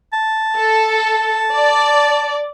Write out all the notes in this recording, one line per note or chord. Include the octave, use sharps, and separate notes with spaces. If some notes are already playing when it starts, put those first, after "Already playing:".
A5
A4
D5